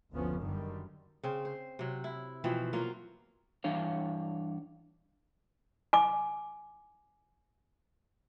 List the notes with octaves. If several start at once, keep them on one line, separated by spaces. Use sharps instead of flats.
F#1 D2 F3 B3 C#4
F#2 D3 D#3 G3
C#3 C4
C5
C3 F#3
E4
B2 E3 F3 C4
F#3 A#3 F4
G2 E3 D4 C#5 F5
G#5 D6